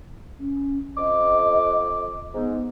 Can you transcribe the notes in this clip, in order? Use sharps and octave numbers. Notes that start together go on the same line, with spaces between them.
C#4
F2 D#5 D6
G#2 B3